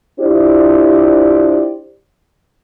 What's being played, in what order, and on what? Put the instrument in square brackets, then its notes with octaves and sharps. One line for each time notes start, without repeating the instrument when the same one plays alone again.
[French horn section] D4 E4 F4 G4 C5 D5